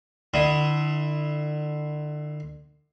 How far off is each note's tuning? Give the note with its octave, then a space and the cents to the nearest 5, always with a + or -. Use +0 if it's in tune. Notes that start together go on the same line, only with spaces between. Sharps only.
D3 +35 E4 +0 D#6 +25